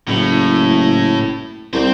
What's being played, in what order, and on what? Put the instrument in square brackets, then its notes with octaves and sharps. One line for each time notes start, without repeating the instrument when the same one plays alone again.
[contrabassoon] F#1 [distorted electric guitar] A2
[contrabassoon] C2 [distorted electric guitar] C4 C5